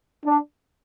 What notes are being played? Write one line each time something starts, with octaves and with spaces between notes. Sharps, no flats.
D4